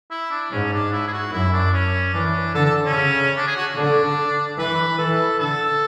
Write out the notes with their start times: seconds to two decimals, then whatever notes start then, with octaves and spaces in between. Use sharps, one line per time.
0.11 E4
0.31 D4
0.51 G#2 C#4
0.73 D4
0.92 E4
1.07 G#4
1.13 F#4
1.32 F#2 E4
1.53 D4
1.73 C#4
2.14 E3 D4
2.54 D3 A4
2.65 A4
2.85 C#4
2.96 C#3
3.36 D4
3.47 G#4
3.56 F#4
3.76 D3 D4
4.58 E3 B4
4.98 E3 A4
5.39 D3 A4